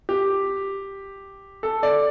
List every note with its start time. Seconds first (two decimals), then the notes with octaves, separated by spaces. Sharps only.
0.09 G4
1.63 A4
1.83 D5